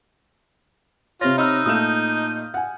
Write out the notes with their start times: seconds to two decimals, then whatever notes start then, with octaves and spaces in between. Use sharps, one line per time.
1.21 C3 C4 F4 C#5 A#6
1.38 D#4 B5 E6 F6
1.66 A#2 A3 D#6 F6 G6 E7
2.54 F#5 G#5